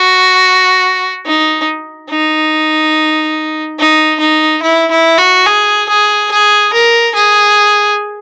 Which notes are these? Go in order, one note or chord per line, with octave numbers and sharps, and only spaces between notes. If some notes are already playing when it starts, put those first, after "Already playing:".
Already playing: F#4
D#4
D#4
D#4
D#4
E4
E4
F#4
G#4
G#4
G#4
A#4
G#4